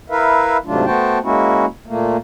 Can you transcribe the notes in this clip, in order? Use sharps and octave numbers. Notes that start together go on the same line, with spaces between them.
E4 A#4 B4 E5 F5
G#2 C3 F#3 A3 D4 F4
A3 B3 F#4 C5 G5 A5
G#3 A#3 C#4 E4 F#4
A#2 A3 A#3